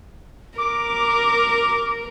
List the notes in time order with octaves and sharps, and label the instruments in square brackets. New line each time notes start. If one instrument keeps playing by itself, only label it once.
[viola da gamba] A#4 [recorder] D6